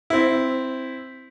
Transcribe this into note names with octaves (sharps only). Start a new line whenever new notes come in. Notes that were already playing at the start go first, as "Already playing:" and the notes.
C4 E4